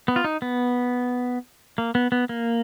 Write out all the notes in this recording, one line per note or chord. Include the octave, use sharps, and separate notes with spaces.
B3
F4
D#4
B3
A#3
B3
B3
A#3